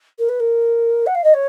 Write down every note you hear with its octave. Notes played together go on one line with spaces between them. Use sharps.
A#4
B4
A#4
F#5
F5
D#5
C#5